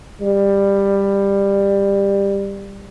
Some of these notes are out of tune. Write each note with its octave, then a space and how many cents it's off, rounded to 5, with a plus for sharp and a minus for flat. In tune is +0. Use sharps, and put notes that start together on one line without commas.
G3 +15